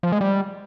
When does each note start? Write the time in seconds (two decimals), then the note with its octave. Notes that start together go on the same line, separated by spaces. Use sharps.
0.03 F3
0.12 G#3
0.21 G3